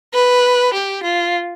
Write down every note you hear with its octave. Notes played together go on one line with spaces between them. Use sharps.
B4
G4
F4